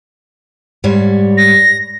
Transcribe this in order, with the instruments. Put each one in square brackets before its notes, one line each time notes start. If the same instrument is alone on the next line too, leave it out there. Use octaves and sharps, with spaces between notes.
[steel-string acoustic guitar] G#2 G3 C#5
[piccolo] A#6